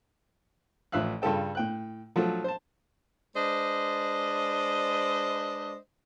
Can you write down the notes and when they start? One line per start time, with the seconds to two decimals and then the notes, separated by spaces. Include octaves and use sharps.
0.92 A1 F3 E5 F5 F#6
1.22 G2 C#3 F4 A4 G5
1.55 A2 G5 F#6
2.16 F3 F#3 A3
2.44 C5 A5
3.35 G#3 D4 B4 C5 D5 D#5